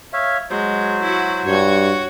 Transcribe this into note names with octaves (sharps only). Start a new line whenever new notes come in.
C#5 E5 F5
F#3 G#3 C5
E4 F#4
G2 F#4 C#5